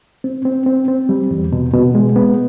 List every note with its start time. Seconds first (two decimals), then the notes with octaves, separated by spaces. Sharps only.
0.24 C4
0.45 C4
0.66 C4
0.88 C4
1.09 G3
1.31 E2
1.52 B2
1.74 B2
1.95 G#3
2.16 B3